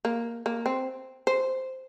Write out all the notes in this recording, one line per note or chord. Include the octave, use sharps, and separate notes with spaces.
A#3
A#3
C4
C5